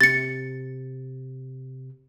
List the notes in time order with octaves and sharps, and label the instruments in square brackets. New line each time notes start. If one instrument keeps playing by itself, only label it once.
[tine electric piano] C3 [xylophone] A6 C#7